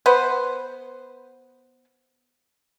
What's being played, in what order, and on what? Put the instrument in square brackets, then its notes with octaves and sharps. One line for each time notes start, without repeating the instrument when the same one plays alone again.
[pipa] B3 B4 C5